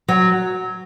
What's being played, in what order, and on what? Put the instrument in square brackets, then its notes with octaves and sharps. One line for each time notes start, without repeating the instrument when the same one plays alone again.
[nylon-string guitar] F#3